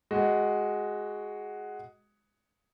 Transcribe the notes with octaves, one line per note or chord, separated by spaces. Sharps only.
G#3 F#4